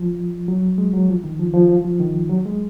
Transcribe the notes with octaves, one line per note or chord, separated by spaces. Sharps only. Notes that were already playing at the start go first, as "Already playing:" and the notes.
Already playing: F3
F#3
G#3
F#3
F3
D#3
F3
F3
F3
F3
D#3
F#3
G#3